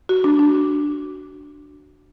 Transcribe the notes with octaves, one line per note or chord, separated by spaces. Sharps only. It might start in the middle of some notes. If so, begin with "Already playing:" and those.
F#4
D4
D4